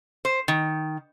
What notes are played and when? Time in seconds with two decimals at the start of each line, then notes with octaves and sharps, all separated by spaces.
0.25 C5
0.48 D#3